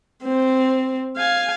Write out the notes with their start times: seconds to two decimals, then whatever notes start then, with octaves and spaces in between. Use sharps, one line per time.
0.23 C4
1.17 F5 G#5